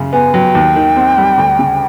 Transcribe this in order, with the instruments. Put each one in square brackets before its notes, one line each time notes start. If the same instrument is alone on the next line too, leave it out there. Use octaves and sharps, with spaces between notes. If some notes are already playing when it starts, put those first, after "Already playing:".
Already playing: [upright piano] F#2 C#3
[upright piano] B3 [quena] G#5
[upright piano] F#3 [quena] G5
[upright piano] D#2
D#3
C4
G3
D2
C#3